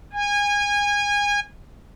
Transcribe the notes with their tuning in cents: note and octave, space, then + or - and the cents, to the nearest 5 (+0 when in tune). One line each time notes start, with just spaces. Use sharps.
G#5 -25